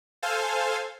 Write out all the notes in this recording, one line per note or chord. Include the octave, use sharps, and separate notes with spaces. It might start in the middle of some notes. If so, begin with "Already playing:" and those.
A4 C5 F5 G#5